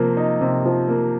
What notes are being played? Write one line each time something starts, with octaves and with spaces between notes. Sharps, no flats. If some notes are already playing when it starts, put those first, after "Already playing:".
Already playing: C3 F3 A#3
D#4
C3
F3
A#3